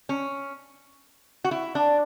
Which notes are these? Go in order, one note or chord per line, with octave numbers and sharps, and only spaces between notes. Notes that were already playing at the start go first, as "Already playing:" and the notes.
C#4
F#4
E4
D4